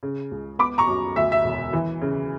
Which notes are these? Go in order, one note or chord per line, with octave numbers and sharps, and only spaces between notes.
C#3
C#2
B3 B5 D6
A#5 C#6
F#2
D2 E5
E5
E1
E3
C#3